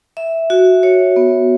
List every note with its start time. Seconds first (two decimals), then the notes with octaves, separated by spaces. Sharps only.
0.17 E5
0.50 F#4
0.83 C#5
1.16 B3